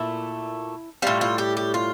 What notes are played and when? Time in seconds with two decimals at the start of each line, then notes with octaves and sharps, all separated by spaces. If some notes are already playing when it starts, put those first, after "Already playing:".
Already playing: A#2 A3 E4
1.02 A2 G3 F4
1.21 F4
1.38 G4
1.57 G4
1.74 F4